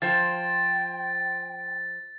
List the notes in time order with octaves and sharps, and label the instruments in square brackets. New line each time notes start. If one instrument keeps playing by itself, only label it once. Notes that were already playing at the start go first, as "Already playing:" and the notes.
[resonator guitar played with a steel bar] F3 C5 [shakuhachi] G5 [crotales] A6